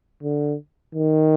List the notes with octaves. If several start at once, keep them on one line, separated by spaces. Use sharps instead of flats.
D3
D#3